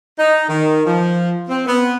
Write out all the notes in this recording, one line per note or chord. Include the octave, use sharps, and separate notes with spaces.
D#4
D#3
F3
C4
B3